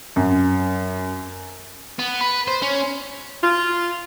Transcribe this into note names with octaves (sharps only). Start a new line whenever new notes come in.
F#2
B3
B4
C5
C#4
F4